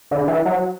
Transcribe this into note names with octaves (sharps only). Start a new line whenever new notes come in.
D3
E3
F#3